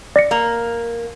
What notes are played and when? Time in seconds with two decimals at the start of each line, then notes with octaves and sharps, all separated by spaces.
0.16 D5 A#6 C#7
0.31 A#3